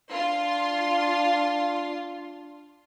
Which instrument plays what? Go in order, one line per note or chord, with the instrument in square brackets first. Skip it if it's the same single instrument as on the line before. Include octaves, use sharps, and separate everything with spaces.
[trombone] D4 [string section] F4 C6